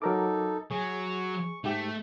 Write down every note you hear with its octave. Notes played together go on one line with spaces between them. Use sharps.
F#3 D#4 A4 A#4 D6
F#3 G#4 C#6
G#2 A3 G4